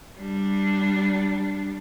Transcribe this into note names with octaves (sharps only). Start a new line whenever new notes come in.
G3 D4